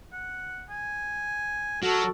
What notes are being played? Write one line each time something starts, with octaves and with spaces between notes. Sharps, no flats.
F#5
G#5
F#3 F#4 A4 A#4